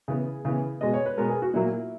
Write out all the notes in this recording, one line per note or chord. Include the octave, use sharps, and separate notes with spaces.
C#3 E3 B3 G#4
C#3 E3 B3
B2 G#3 B3 D#5
C#5
B4
B2 G#3 B3 A#4
G#4
F#4
A#2 F#3 A#3 E4